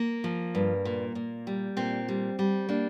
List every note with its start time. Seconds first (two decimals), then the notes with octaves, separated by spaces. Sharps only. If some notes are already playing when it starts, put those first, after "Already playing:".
Already playing: A#3
0.24 F3
0.55 G2
0.85 A#2
1.15 A#2
1.47 G3
1.77 A#2 C4
2.08 G3
2.39 G3
2.69 A#3 D4